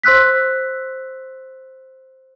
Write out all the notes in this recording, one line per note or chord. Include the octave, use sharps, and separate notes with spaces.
C5 C6 E6 F#6 B6